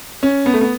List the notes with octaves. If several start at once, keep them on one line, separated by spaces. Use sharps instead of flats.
C#4
B3
A3
B3